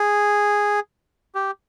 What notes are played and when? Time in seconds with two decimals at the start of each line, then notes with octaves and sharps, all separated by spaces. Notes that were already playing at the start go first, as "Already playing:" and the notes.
Already playing: G#4
1.35 G4